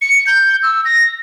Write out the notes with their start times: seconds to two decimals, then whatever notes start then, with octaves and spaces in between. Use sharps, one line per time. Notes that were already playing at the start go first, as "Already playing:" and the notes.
0.02 C#7
0.27 G6
0.63 E6
0.85 A#6